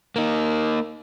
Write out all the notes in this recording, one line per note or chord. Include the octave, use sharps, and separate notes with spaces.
A#3 D#4